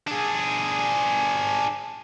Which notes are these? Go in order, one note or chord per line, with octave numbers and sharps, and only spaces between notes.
D4 G#4